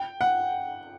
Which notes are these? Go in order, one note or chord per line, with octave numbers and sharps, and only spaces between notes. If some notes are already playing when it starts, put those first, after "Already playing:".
Already playing: G5
F#5